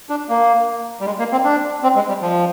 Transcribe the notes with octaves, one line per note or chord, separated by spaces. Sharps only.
D4
A#3
G3
G#3
A#3
C4
D4
C4
G#3
G3
F3